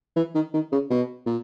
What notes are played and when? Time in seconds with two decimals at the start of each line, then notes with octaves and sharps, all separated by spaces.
0.16 E3
0.35 D#3
0.54 D#3
0.72 C#3
0.90 B2
1.26 A#2